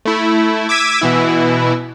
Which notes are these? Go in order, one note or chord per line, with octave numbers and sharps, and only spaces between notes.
A3 E4
D6 E6 G#6 B6 D#7
B2 E3 E4